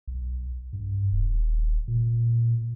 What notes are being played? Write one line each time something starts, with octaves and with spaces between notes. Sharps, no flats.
B1
G2
D#1
A#2